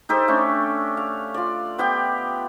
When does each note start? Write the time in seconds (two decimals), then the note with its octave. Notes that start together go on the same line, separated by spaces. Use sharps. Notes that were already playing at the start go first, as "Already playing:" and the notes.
0.09 D#4 G4 A4 C5
0.28 A3 C#4 D4
0.97 F5
1.34 F4 D5
1.78 B3 G4 F5 G5